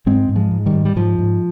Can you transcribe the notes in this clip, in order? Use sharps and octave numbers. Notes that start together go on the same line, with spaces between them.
G#2 G#3 C4
G#2
F3 G#3
G#2
D#3 G3
G#2
G3
G#2 F3
G#2